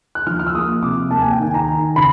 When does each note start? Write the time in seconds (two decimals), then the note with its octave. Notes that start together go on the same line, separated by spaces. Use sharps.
0.15 F#6
0.27 F3 F6
0.39 F6
0.47 E6
0.54 A#3 D#6
0.83 C3 D6
1.11 A#3 A5
1.21 G#5
1.31 G5
1.39 D#3 G#5
1.54 A#5
1.67 D#3
1.96 C#3 B5